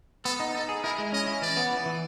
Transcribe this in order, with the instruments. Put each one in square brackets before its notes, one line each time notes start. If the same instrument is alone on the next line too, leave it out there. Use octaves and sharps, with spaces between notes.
[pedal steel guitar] B3 [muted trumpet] A4
[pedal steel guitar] D#4
[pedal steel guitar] D#4 [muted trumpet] A4
[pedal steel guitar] G#4
[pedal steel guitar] E4 [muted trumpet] A#4
[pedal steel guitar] G#3
[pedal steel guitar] C#4 [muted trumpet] D#5
[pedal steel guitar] E4
[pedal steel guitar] E3 [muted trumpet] D5
[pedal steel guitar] B3
E3
E3